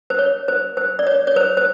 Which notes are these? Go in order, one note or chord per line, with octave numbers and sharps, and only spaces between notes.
C5
C#5
C5
C5
D5
C#5
C#5
C5
C5